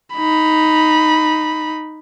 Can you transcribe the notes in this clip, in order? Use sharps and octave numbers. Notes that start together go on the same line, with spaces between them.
D#4 B5